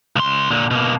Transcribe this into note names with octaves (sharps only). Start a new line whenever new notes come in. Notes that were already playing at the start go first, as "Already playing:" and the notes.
C#2 C6
A#2 D3
B2 A#3